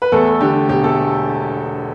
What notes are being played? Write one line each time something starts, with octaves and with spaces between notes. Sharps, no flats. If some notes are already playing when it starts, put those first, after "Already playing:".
B4
E2 A3 A4
D3 G4
E1 G4
A3 A4